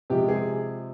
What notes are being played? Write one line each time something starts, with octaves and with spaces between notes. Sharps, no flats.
C3 F3 G#3 G4
G#4